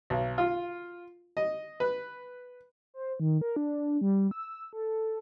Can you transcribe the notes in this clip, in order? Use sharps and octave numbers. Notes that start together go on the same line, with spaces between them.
B1
F4
D#5
B4
C5
D#3
A#4
D4
G3
E6
A4